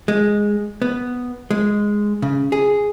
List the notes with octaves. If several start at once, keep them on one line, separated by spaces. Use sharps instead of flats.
G#3
B3
G#3
C#3
G#4